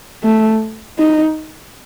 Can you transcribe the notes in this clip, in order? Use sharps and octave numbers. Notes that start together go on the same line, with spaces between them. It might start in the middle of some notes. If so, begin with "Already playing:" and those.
A3
D#4